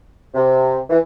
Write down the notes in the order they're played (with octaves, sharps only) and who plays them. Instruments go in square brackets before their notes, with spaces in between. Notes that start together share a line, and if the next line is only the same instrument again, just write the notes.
[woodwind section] C3
E3